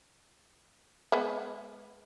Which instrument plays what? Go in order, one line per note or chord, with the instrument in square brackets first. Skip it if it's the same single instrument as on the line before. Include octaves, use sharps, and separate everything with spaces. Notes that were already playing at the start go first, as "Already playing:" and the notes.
[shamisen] G#3 B3